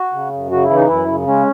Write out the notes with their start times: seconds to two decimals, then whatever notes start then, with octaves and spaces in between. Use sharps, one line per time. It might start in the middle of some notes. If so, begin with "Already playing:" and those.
Already playing: F#4
0.13 C#3
0.33 F#2
0.51 C#3 F#4
0.64 E4
0.69 E3
0.75 D#4
0.88 F#2 E4
1.08 C#3
1.27 G#3 C#4